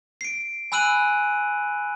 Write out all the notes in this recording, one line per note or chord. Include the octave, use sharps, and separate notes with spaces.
C7 D7
G#5 B5 E6 F#6 D#7 F#7